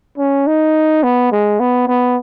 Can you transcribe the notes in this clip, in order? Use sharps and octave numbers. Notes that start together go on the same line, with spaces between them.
C#4
D#4
B3
G#3
B3
B3